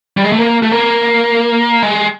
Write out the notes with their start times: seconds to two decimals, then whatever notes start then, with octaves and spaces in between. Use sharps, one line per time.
0.17 G3
0.25 G#3
0.32 A3
0.39 A#3
0.63 A3
0.72 A#3
1.82 G#3